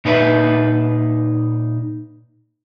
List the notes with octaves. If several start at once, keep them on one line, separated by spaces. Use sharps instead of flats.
A#2 D#4 B4 C#5 E5 B5